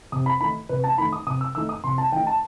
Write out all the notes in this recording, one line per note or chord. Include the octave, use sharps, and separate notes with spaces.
C3 D#6
B5
D#3 A3 D#4 B5
C3 B4
A5
D#3 A3 D#4 B5
D#6
C3 D#6
E6
D#3 A3 D#4 E6
D#6
C3 C6
A5
D#3 A3 D#4 G5
A5